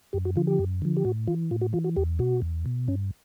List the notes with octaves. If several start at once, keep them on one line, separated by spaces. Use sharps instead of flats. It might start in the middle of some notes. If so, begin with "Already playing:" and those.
F#2 G4
F#4
D3 F3 F4
G4
F#2
D3 F3
G4
A2 F#4
E3 F4
A2 F4
F#4
E3 F4
F#4
E2 G4
B2 F#4
E2
B2
G2 C#4